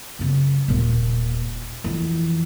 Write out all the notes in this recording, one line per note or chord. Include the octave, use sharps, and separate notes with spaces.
F#2 C#3
D#1 A#2
F2 E3